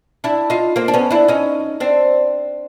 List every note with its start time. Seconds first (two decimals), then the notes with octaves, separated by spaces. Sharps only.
0.24 D4 E4
0.50 D#4 F4
0.76 A#3 C4
0.88 D4
0.94 B3 C#4
1.11 D4 E4
1.28 C#4 D#4
1.80 C4 D4